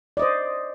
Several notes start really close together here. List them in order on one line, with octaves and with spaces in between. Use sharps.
D5 D#5 C5